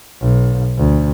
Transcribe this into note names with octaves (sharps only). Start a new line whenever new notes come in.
B1
D2